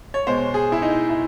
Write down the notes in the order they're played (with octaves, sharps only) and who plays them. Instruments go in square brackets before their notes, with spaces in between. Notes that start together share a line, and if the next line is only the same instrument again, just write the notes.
[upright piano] C#5
B2 G#3 C5
G#4
E4
D#4
E4